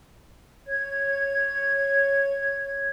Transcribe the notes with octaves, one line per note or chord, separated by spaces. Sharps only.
C#5 G#6